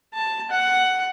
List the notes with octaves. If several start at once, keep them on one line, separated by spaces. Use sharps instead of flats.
A5
F#5